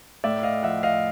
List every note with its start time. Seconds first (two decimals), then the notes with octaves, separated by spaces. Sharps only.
0.24 A2 D5 E5
0.43 D#5 F5
0.63 F3 E5 F#5
0.83 D#5 F5